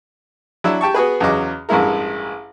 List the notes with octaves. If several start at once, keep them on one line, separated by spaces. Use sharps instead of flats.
F#3 D4 E4 E5 E6
G4 G5 A5 C#6
B3 F#4 G#4 B4
E2 C#3 F#3 D#5 D6
A1 G2 G#3 E4 A#4